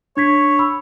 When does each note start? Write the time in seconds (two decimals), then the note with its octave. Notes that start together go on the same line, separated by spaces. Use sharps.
0.17 D4 C#5 G#6 B6
0.59 B5 E6